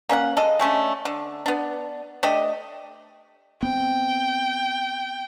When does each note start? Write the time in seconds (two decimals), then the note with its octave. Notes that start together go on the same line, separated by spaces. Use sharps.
0.09 A#3 C#4 D#5 F#5
0.37 G#3 A4 D#5
0.59 G#3 A3 C#4 D4
1.05 D3
1.46 B3 D4
2.23 A3 D4 G4 D#5
3.63 B3 C4 G5